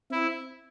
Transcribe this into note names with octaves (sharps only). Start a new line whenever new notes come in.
C4 E4